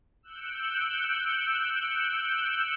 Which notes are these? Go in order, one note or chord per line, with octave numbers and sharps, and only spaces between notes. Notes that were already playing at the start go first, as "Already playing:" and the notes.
E6 F#6 G6 C#7 D7